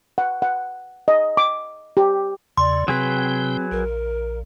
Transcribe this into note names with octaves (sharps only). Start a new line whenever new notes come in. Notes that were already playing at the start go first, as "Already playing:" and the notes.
F#5
F#5
D#5
D6
G4
E2 C#3 D5 C6
C3 F#3 C4 G#4 B4 G5
A#1 A#4